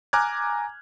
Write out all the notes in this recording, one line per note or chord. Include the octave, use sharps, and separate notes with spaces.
G#5 A#5 D6 F6 F#6 G#6